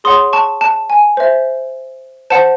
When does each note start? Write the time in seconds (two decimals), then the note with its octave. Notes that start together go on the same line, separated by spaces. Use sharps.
0.04 G#4 C#5 F#5 C6 D#6
0.33 A5 C#6
0.61 A5
0.90 G#5
1.17 C5 E5
2.30 C5 F#5 A5